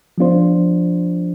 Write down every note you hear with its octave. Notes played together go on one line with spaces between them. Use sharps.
F3 B3 D4 F4 C5